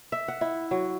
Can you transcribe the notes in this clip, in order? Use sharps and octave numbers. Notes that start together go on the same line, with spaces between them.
E5
F#5
E4
F#3